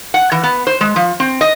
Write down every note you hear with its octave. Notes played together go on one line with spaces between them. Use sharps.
F#5
E3
B3
C5
G#3
F3
C4
D#5